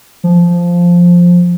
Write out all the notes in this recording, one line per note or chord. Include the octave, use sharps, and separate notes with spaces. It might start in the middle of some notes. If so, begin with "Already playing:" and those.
F3